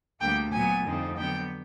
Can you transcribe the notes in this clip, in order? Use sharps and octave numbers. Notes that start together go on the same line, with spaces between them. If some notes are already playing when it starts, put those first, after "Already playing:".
D2 D3 G3 A#3 G5
A#2 F#3 B3 G#5
F2 D3 G3 C4 D#4
D3 F#3 B3 G5